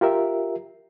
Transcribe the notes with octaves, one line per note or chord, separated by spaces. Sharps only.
F4 G4 A#4 E5